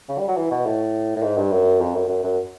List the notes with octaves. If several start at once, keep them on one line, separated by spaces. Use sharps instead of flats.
C#3
G3
F#3
E3
B2
A2
A2
G#2
G2
F#2
F2
F#2
F#2
F#2